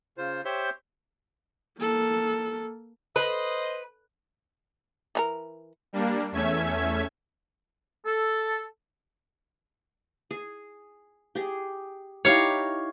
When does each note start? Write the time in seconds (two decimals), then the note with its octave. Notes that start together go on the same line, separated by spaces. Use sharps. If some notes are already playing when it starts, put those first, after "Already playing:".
0.18 C#3 F4 C5
0.45 G4 C5 C#5 E5 G6
1.78 A#3 A4
3.16 B4 C5 D#5
5.15 E3 F4 A#4
5.93 G3 A#3 D4
6.32 E2 A3 C#4 E5 G#6
8.05 A4
10.31 G#4
11.35 G4 G#4
12.25 D#4 E4 G4 C#5 F5